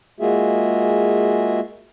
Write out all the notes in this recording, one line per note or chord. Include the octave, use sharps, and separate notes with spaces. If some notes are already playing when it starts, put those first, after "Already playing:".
G#3 A#3 F4 F#4 G#4 E5